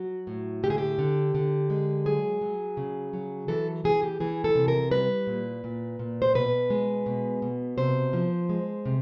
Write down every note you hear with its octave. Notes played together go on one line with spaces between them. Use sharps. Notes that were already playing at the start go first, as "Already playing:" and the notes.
Already playing: F#3 F#4
A2
D3 G4
G#4
G4
D3
D3
G#3
F#3 G#4
F#3
C#3
F#3
E3 A4
E3 G#4
G4
E3 G#4
A4
C3
A#4
G3 B4
A#2
A#2
A#2
C5
B2 B4
G#3
B2
B2
C3 C5
F3
G#3
C3